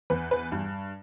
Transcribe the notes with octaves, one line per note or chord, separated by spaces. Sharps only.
E2 B4
B4
G2